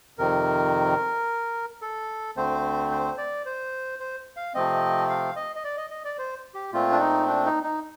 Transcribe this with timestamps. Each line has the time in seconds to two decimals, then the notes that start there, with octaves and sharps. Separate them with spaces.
0.18 F2 C3 D#3 A#4
1.82 A4
2.37 D2 D3 A3 C4 C5
2.91 C5
3.18 D5
3.46 C5
4.00 C5
4.37 F5
4.54 C3 F3 A3 C4 D#5
5.09 F5
5.36 D#5
5.56 D#5
5.64 D5
5.77 D#5
5.90 D#5
6.05 D5
6.18 C5
6.54 G4
6.73 A#2 A3 C4 F4
6.92 D4
7.00 D#4
7.27 D4
7.45 D#4
7.63 D#4